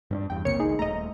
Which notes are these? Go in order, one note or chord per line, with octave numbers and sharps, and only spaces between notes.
G2 C#4 D4
E2 G2 G5
B1 C3 A#3 C#5 C#7
G#1 D2 D#4 G#4
D#1 A3 D#5 A#5